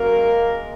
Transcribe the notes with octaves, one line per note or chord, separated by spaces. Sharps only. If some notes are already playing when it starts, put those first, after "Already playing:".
Already playing: F#2 A#3 A#4
G#3